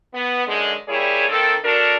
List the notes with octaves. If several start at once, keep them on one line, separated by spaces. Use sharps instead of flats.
B3
F#2 D3 G#3
G3 A#3 E4 G#4 C#5
D#3 A#3 C4 A4
D4 F#4 A4 A#4